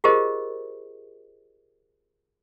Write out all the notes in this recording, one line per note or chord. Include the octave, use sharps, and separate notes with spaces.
F4 G4 G#4 A#4 C5 D#5